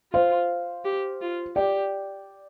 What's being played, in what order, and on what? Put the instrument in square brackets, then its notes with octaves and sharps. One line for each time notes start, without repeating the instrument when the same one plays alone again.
[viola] F4 [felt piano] C5 F5
[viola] G4
F4
[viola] G4 [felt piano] D5 G5